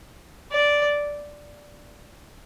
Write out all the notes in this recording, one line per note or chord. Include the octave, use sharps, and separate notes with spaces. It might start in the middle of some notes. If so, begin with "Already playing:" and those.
D5